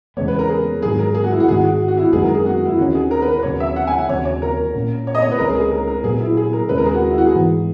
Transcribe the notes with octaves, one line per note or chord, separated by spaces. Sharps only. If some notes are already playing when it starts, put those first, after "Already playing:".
E2 C#3 G#3 B3 C#5
B4
A#4
G#4
G#2 D#3 F#3 G#4
A#4
G#4
F#4
E4
F#4
G#2 D#3 G#3 G#4
F#4
F#4
E4
F#4
F#2 D#3 G#3 B3 G#4
A#4
G#4
F#4
E4
D#2 D#3 A#3 C#4 F#4
G#4
A#4
B4
B4
D#2 C#3 F#3 C#5
E5
F#5
G#5
F#5
D#2 C#3 F#3 C#5
C#5
A#4
A#2 A#3 C#4
C#5
D#5
C#5
B4
C#2 C#3 F#3 C#4 A#4
G#4
G#4
A#4
A#4
A#2 F#3 B3 G#4
E4
G#4
A#4
D#2 C#3 G#3 C#4 B4
A#4
G#4
F#4
E4
F#4
G#4
G#2 E3 B3